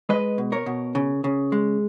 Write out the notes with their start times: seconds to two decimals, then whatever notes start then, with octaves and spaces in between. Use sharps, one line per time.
0.09 G#3 B4 D#5
0.38 B2
0.52 A#4 C#5
0.66 B2
0.95 C#3
1.24 C#3
1.52 G#3